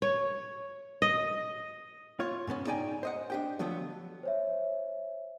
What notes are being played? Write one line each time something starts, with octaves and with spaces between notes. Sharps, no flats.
C#5
D#5
F4 C#5
G#2 C#3 B3 C#4
D#4 G#4 D5 G5 G#5
C5 D#5 F#5
D4 G4 G5
D3 F3 F#3 A3 B3
C5 C#5 E5